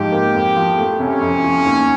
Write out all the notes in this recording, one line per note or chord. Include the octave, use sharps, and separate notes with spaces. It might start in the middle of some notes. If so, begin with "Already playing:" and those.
Already playing: G#2 F3 D#4 G4
A#3
F2
F3
A3
C3 C#4
F2
F3
D#2